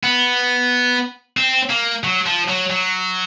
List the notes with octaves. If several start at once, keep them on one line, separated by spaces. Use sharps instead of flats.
B3
C4
A#3
F#3
F3
F#3
F#3